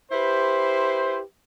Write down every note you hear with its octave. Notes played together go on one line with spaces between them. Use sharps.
E4 G4 B4 C5